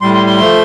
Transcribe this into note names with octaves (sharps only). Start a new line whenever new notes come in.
A2 G3 C6
C6
C6
F3 A3